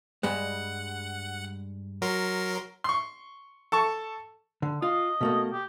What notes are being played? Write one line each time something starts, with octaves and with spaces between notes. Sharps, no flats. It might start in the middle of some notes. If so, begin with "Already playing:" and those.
G2 G3 G#3 F#5
F#3 A#4 C6
C6 C#6
A4 A5 C#6
D3
F4 D#5
B2 A3 A#3
G4